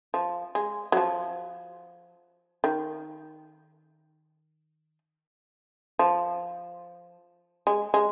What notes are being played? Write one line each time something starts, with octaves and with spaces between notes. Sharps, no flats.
F3
G#3
F#3
F3
D#3
F3
G#3
G#3